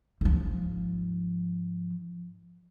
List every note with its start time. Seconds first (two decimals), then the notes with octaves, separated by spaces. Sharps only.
0.21 G#2 F3